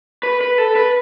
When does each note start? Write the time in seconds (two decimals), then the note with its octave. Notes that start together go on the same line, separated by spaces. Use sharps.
0.23 B4
0.41 B4
0.58 A4
0.76 B4